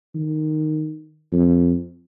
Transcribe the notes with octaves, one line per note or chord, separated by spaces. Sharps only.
D#3
F2